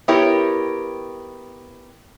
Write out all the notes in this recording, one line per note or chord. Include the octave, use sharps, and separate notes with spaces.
B3 E4 G4 A#4 C#5